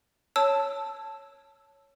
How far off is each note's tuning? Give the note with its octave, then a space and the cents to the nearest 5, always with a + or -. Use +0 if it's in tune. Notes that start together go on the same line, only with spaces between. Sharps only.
C#5 +0 A5 +0 E6 +0